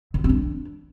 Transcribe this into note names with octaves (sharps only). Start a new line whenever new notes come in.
D3
F4
C4
D4